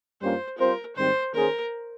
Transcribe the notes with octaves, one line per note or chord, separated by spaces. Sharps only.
G2 G3 A#3 C#4 F4 C5
G3 C4 F4 A#4 C5
G#2 D#3 G3 C4 C5
D#3 A#3 C#4 G#4 A#4 C5